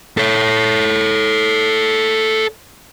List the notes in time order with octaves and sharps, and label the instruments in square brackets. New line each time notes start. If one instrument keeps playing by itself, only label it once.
[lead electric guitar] A4 C#5